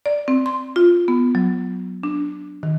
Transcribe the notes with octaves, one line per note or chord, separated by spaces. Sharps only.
D5
C4
C6
F4
B3
F#3
D4
D#3